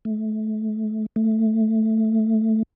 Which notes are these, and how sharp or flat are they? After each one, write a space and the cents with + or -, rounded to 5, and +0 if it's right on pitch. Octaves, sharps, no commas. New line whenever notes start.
A3 -25
A3 +5